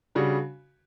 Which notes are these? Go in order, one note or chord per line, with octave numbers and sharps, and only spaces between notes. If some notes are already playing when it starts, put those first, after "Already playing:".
C#3 G3 D4 F#4